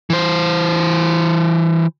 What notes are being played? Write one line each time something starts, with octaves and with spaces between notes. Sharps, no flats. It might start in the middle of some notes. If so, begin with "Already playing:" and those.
E3 C5